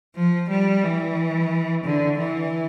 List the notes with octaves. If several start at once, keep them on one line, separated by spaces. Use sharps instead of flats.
F3
G3
E3
D3
E3